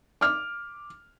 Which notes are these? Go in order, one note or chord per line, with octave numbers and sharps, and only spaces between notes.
D6 F6